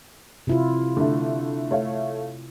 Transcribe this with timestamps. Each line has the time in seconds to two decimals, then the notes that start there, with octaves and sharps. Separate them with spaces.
0.47 C3 E4 F4
0.97 D3 A3
1.71 A3 C#5 F5